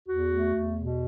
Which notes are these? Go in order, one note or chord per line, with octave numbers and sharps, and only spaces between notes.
E2 F#4
A3
E2
B2